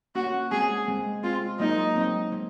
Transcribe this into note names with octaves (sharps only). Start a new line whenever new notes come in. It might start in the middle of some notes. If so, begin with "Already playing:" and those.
A#3 C#4 F#4
G#3 C4 G#4
G#3 C4
G#3 C4 F4
F#3 A#3 D#4
G#3 C4
G#3 C4